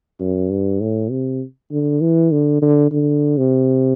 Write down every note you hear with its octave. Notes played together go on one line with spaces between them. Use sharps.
F#2
G2
A2
C3
D3
E3
D3
D3
D3
C3